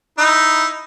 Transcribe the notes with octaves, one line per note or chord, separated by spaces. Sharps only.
D#4 E4